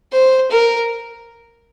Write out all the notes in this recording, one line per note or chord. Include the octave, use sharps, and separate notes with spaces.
C5
A#4